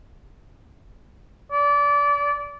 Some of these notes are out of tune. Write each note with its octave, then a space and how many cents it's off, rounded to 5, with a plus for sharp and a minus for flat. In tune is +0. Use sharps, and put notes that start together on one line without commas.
D5 -25